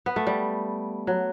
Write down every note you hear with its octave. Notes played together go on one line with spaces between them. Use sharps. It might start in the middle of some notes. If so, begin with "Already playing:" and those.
B3
A3
G3
F#3